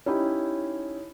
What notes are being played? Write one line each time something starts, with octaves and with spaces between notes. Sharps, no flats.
C#4 D#4 E4 G4